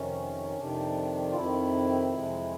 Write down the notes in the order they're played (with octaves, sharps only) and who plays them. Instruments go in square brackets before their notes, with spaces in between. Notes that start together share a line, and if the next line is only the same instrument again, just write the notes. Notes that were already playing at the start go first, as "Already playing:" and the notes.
Already playing: [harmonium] F2 C3 D#3 C#4
F2 C3 D#3 D4
F4
F2 C3 D#3 E4
F2 C3 E3 G#3